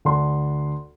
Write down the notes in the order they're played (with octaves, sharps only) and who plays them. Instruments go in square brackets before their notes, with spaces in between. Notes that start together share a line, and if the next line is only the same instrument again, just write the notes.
[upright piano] D2 D4 C6